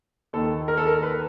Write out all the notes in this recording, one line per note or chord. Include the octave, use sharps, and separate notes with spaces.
D#2 D#3 A4
A#4
A4
A#4
B4